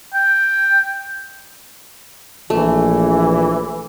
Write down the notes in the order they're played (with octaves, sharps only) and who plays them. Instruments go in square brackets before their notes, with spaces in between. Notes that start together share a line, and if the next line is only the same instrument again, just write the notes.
[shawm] G5
[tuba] A#1 [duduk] E3 [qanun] A3